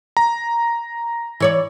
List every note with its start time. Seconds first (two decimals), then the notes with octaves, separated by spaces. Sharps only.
0.17 A#5
1.40 E3 C#5 D5